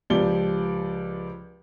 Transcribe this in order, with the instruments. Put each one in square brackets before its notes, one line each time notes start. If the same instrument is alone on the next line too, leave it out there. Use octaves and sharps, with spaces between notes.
[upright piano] C#2 F3 G4 D5 G7